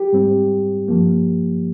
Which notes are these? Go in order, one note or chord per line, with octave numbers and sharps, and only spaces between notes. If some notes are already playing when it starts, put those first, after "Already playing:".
Already playing: G4
G#2 G3 C4
G2 F3 A#3